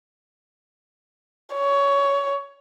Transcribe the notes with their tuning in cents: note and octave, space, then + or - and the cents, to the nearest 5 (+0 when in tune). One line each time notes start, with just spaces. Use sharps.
C#5 +15